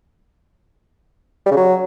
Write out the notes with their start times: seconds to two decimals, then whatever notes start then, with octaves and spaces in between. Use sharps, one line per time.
1.46 G3
1.51 C#3
1.56 F#3